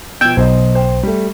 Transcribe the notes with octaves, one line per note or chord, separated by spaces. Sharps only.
B2 F3 G5 E6 G#6
B1 C5 D#5
C5 G5
G3 A3